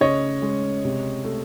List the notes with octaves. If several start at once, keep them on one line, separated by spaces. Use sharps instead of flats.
C#3 C#5 D#5
G#3
C3
A3